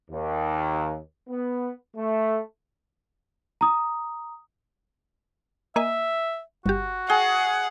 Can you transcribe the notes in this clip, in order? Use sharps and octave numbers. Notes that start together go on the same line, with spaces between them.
D#2
B3
A3
A#5 D#6
A#3 D#5 E5 G#5
G1 F#4 G4
G#4 F#5 G5